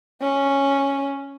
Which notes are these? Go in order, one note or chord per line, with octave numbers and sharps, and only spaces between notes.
C#4